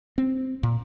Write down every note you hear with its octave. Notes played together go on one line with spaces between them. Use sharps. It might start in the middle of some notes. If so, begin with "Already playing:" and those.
C4
A#2